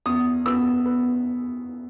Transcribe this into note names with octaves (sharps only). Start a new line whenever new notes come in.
E2 D#6
B3 E6
B3